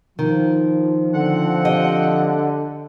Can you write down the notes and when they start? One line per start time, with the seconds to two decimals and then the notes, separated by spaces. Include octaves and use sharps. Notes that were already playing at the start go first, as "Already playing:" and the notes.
0.19 D#3 F3
1.14 D3 C4 F#5
1.65 G4 D#5